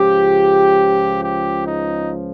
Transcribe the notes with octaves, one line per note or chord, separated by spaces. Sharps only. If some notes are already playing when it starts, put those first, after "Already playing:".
Already playing: C#2 C#3 F3 G4
G4
D#4